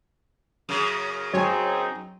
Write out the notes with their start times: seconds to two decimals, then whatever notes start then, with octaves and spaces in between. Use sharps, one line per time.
0.69 F#2 C#3
1.33 F#3 C4 D#4 G#4 C#5 G#5